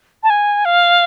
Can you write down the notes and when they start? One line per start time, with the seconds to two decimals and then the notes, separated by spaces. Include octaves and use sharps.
0.23 A5
0.30 G#5
0.65 F5